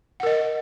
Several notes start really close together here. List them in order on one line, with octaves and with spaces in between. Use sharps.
F#5 A#4 D#5